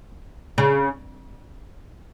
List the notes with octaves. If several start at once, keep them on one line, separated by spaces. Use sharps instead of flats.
C#3